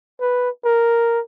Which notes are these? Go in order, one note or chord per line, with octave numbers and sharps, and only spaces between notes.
B4
A#4